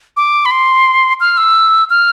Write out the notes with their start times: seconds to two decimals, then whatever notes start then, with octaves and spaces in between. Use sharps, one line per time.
0.17 D6
0.46 B5
0.51 C6
1.20 F6
1.37 E6
1.90 F6